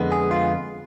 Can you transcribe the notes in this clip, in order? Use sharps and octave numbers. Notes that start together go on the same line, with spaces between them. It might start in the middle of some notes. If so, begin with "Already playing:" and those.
Already playing: F2 D3 G#3 B3
G#4
F4